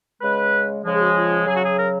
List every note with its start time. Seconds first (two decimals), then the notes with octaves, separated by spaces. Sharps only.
0.22 C#3 G#3 B4
0.84 C#3 F3 G#3
0.93 G#4
0.99 F#4
1.14 F4
1.46 C#3 F#3 G#4
1.54 F#4
1.63 G#4
1.77 A#4